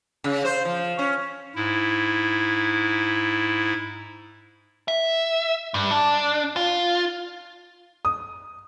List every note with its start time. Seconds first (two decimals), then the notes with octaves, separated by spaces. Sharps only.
0.24 C#3
0.45 C5
0.65 F3
0.99 C#4
1.55 G#2 E4
4.88 E5
5.74 G2
5.91 D4
6.56 F4
8.05 D#6